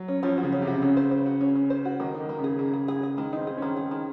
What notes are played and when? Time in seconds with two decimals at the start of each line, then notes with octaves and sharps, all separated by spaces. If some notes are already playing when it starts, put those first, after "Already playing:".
Already playing: F#3
0.08 C#4
0.23 F3 C#4
0.38 F#4
0.43 C#3
0.52 C#4
0.62 C3
0.67 F#4
0.82 C#3 C#4
0.97 C5
1.11 C5
1.26 F#4
1.41 C#4
1.56 C#4
1.70 C5
1.85 F#4
2.00 D#3 A#3
2.15 D#4
2.20 D#3
2.29 A#3
2.39 C#3
2.44 G#4
2.59 C#3 A#3
2.73 G#4
2.88 G#4
3.03 G#4
3.17 D#3 G#3
3.33 C4 D#4
3.47 G#4
3.58 C#4
3.62 D#3
3.77 G#4
3.91 D#3